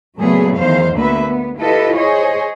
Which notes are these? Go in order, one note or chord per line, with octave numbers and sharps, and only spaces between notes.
A#2 C#3 F#3 A3 B3 G#4
E2 D#3 C5 F5
D2 A#3 B3 B4 E5
B3
E4 F4 G4 A4 B4 D#5
G#4 C5 C#5 D#5